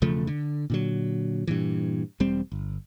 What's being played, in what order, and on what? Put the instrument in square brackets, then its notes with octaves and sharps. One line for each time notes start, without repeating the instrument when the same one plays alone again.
[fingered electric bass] E1 C#3 F3 A3
D3
A#2 D3 F#3
G2 A#2 E3
E1 G3 C4
G1